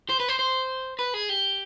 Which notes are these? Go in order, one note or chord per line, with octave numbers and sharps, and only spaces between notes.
C5
B4
C5
C5
B4
G#4
G4